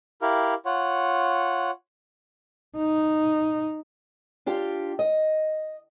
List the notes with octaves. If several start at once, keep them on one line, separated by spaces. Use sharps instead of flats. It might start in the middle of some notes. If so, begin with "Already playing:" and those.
E4 G4 A#4 F5
F4 C#5 F#5
D#4
D4 F4 G4 D5
D#5